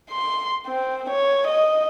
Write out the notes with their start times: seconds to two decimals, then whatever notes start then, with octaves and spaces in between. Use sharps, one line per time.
0.11 C6
0.67 C4
1.10 C#5
1.47 D#5